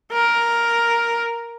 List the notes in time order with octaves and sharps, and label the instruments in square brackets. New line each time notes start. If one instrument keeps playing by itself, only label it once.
[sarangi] A#4